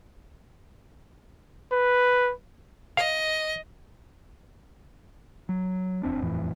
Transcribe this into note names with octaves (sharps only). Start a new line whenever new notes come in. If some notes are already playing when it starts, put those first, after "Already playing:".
B4
D#5 F5
F#3
F1 E2 C4 D4
D#1 F2 A2 E3